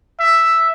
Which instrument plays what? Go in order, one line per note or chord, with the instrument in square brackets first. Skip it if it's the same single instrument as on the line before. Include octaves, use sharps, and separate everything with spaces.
[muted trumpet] E5